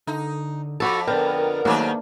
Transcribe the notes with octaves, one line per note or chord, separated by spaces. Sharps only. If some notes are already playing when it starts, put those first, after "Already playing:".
D3 D#4
F2 F#4 A4
D3 B3 A#4 G5
G#2 D#3 F#3 A3 A#3 C#4 D4